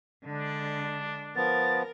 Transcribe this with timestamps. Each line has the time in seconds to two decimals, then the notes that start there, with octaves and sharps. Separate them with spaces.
0.24 D3 G#3 D4
1.36 F3 B3 A#4 A6